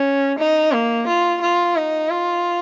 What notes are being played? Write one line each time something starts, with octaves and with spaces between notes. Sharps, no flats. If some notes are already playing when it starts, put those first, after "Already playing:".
Already playing: C#4
D#4
A#3
F4
F4
D#4
F4